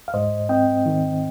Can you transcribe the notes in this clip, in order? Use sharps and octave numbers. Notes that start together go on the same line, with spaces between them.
F5
G#2 C5 D#5
C4 D#5 G5
D#3